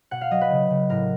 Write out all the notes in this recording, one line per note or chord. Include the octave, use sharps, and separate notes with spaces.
B2 F#5
F5
F#3 D#5
B4
C#3
C#3
A2 A#4